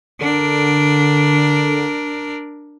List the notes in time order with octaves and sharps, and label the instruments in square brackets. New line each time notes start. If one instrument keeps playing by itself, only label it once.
[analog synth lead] D3 [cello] D4 A#4